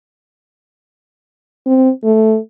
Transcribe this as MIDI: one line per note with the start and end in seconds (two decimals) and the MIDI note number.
1.66 1.90 60
2.04 2.38 57